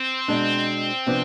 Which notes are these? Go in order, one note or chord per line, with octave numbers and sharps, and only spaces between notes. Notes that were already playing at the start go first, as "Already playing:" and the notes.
Already playing: C4
B2 G#3 D4
C3 F3 B3 D4